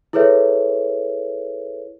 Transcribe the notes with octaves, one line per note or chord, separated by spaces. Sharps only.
E4 G#4 A4 B4 C#5 E5